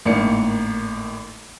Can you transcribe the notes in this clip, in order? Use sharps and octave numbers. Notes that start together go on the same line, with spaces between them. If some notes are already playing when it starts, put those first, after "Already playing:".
G#1 A2 A#3 D4 C#7